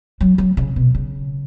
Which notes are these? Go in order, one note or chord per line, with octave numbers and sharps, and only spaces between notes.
F#3
F#3
C#3
B2
C#3